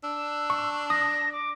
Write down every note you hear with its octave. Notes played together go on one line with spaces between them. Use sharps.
D4 E6
C#6
D#6 A#6
D6